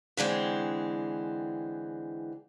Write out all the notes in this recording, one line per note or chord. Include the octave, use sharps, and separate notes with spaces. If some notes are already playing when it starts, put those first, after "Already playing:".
D3 E3 G#3 C4